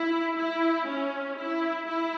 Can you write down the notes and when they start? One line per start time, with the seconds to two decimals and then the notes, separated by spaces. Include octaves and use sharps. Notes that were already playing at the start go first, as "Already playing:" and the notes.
Already playing: E4
0.35 E4
0.86 C#4
1.37 E4
1.87 E4